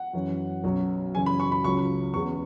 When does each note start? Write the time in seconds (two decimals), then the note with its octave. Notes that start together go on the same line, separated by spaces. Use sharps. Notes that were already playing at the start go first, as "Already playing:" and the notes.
Already playing: F#5
0.13 F#2 E3 C#4
0.64 B1 B2 F#3 C#4
1.15 F#2 C#3 E3 C#4 G#5
1.26 B5
1.40 C#6
1.52 B5
1.64 C#2 C#3 F#3 C#4 C#6
2.14 E2 C#3 G#3 B3 C#6